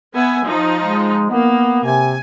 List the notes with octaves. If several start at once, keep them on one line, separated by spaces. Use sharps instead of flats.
B3 E5 G#5
F3 D#4
G#3
A#3 B3
C3 G#5